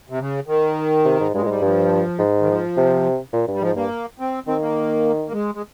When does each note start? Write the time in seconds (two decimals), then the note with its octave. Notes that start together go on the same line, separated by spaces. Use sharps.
0.10 C3
0.20 C#3
0.47 D#3
1.05 C3
1.20 G#2
1.34 G2 G#3
1.43 A#2
1.47 G#2 G3
1.62 G2 F3
2.19 G#2
2.40 D#3
2.48 F3
2.77 C3
3.33 A#2
3.48 G2
3.54 G3
3.61 G#2 F3
3.76 G2 A#3
4.20 C4
4.47 D#3 C4
4.62 A#3
5.28 A#3
5.33 G#3
5.55 G#3